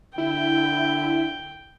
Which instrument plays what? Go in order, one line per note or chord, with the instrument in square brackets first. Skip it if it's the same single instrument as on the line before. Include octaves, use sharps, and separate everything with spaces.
[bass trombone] D3 [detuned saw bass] E4 [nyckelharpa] G5